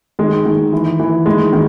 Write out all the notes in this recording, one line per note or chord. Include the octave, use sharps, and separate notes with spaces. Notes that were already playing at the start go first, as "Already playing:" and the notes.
D#3 G#3
D#3
E3
E3
D#3 G#3
D#3